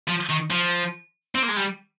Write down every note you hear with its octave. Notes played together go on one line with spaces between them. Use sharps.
F3
D#3
F3
C4
A#3
G#3
G3